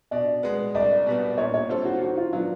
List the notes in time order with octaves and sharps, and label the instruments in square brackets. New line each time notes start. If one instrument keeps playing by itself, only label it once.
[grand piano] B2 [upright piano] D5
[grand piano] G#3 B3
[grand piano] C2 [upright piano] D5
[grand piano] B2 G3 B3
[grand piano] A#2 [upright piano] C#5
[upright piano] C#5
[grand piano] G3 C4 F4 A4 [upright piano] C5
[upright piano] F#4
[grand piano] D#3 [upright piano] F#4
[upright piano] F4
[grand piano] F#3 B3 D4 [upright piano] F4